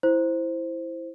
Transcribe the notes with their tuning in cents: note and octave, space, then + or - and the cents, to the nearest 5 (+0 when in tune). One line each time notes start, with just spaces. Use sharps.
E4 +0 C5 +0